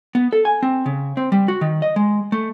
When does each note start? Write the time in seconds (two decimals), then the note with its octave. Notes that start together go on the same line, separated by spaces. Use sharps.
0.15 B3
0.33 A4
0.45 G#5
0.63 C4
0.86 C#3
1.17 C4
1.32 G3
1.48 F#4
1.61 D#3
1.82 D#5
1.96 G#3
2.32 A3